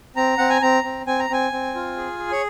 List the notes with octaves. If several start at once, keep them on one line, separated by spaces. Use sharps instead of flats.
C4 A#5
C4 F#5
G#5
C4 A#5
C4
C4 G#5
A#5
C4 G#5
C4
F4
G#4
G#4
C#5